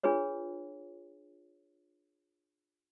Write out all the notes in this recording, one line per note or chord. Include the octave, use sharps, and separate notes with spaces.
D4 F4 G#4 B4 C#5